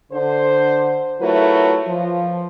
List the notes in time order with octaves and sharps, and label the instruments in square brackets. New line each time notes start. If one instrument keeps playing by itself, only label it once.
[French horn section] D3 C5
F#3 A3 E4 F4 A#4 B4
F3